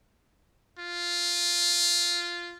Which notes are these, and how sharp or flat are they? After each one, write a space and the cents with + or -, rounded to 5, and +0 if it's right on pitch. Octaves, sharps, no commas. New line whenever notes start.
F4 -5